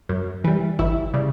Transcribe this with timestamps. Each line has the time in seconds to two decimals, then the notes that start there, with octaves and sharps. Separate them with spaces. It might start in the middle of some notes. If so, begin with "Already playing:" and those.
0.09 F#2
0.44 E3 G3
0.79 G1 E4
1.14 C#3 G3